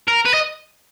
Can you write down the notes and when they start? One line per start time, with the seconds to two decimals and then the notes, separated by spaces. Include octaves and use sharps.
0.08 A#4
0.26 B4
0.34 D#5